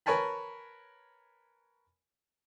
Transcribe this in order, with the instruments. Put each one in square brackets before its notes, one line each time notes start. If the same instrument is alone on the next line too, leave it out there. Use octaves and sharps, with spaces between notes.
[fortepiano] A#4 B4 C#5 G#5 A5 B5